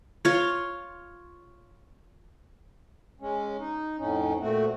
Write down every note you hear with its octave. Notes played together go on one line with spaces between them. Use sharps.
F4 C#5
G#3 C#4
D#4
F2 A2 C#4 D#4
A#2 A3 C4 F#4